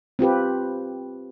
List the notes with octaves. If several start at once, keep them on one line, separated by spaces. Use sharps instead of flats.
C4 F4 G4 B4